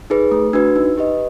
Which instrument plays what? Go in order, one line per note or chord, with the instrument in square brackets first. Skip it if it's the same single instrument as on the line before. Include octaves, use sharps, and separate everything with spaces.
[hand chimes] D#4 G#4 B4
A3
D4 F#4 B4
D#4
G4 B4 D#5